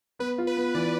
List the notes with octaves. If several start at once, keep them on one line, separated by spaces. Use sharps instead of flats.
B3 B4
F4
B4
B3
E3 D5